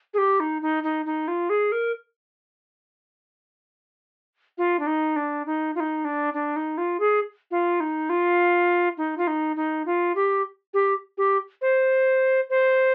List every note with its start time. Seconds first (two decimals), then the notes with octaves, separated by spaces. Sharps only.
0.14 G#4
0.18 G4
0.40 D#4
0.62 D#4
0.83 D#4
1.06 D#4
1.28 F4
1.49 G#4
1.72 A#4
4.58 F4
4.79 D4
4.87 D#4
5.16 D4
5.46 D#4
5.75 F4
5.80 D#4
6.05 D4
6.34 D4
6.56 D#4
6.77 F4
7.00 G#4
7.51 F4
7.80 D#4
8.09 F4
8.97 D#4
9.17 F4
9.27 D#4
9.56 D#4
9.86 F4
10.15 G4
10.74 G4
11.17 G4
11.61 C5
12.50 C5